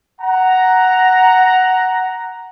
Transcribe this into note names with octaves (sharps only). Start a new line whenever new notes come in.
F#5 A#5